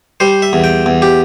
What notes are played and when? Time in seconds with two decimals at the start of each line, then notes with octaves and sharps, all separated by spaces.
0.20 G3 C5
0.42 E5
0.53 E2
0.64 G5
0.86 E2
1.02 G4